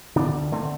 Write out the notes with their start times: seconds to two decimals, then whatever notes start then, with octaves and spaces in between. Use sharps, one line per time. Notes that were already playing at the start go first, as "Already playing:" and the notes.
0.16 D3 B3 D4
0.34 D2
0.52 D3 A3 C4